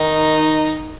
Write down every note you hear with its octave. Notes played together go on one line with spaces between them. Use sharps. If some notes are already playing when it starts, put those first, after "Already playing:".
Already playing: D#3 D#4